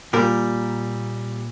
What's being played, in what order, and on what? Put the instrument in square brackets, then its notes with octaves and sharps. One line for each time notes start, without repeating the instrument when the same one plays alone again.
[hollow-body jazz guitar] A#2 A#4 [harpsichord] G3